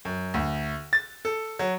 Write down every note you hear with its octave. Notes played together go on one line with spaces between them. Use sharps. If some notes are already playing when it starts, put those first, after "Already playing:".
F#2
D2
A6
A4
F#3